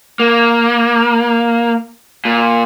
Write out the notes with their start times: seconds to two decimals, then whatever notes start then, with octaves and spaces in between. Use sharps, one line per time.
0.20 A#3
2.25 A#2